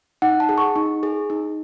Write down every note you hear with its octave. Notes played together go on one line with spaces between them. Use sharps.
D#4 F#5
A5
G#4
C#6
D#4
G#4
D#4